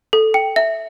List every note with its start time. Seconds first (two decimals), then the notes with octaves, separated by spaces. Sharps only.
0.13 A4
0.34 G5
0.56 E5